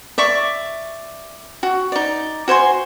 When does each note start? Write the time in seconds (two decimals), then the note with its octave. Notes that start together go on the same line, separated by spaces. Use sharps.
0.18 D5 E5 C#6
1.63 F#4
1.92 D#4 D5
2.48 F#4 C5 G#5 C6